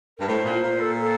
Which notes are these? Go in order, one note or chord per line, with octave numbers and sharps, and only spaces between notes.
G2 A#4
A2 C5
A#2
A#2
A4
A4